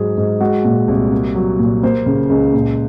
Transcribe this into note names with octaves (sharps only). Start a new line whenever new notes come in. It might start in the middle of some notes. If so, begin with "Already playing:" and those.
Already playing: G#2 F#3 G#4
G#2
G#3 F#4
A#2
C2
A#3
F#3
A#2
A#3 C5
C#3
C#2
A#2